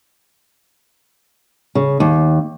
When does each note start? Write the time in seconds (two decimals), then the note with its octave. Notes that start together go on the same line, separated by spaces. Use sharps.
1.75 C#3
2.00 D#2